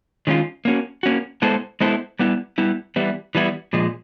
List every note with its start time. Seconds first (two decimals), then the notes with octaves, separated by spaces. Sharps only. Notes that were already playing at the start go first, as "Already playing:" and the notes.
0.27 D#3 G#3 C#4 F4
0.65 A#3 C#4 F#4
1.03 A#3 C#4 F#4
1.42 G#3 B3 E4 A4 C5
1.81 G#3 B3 E4 A4 C5
2.19 G3 B3 E4
2.58 G3 B3 E4
2.96 E3 G3 B3 E4
3.35 E3 G3 B3 E4
3.73 A#2 F3 G#3